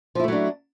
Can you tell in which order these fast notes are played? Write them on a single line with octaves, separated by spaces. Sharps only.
F3 E4 A3 F#3 D4